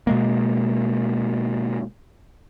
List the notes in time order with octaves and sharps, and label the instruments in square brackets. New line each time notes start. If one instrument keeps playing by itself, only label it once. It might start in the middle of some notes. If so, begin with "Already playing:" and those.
[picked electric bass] B2 G#3 A#3